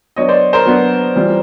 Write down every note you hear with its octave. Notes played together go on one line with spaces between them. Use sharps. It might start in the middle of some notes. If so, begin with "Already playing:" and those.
F#3 B3 D4 C#5 D#5
C5 D5
A#4 C5
F#3 B3 D4
E3 G3 C4 F4